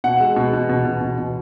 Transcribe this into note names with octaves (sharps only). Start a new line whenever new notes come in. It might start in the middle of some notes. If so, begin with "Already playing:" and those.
B2 F#5
G#3
B2
B2
B2
B2
B2
B2